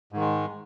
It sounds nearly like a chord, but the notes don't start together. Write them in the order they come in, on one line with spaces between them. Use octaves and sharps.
G#2 D#3 G#3